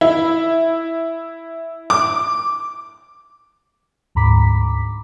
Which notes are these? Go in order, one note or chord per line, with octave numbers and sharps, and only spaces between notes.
E4
D6
D2 G#2 A#5 B5 D6 B6